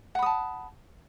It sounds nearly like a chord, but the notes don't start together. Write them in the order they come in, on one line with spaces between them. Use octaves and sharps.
F#5 B5 D#6 A5